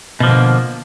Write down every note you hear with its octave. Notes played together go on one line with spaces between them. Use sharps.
B2 D3 F3 A#3